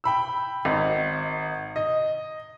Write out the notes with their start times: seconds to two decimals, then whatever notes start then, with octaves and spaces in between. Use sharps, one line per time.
0.04 G5 B5 E6
0.65 G#1 D#5
1.76 D#5